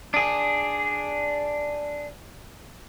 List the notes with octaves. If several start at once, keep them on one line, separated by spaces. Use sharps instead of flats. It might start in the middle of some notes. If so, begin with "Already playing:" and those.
D4 G#4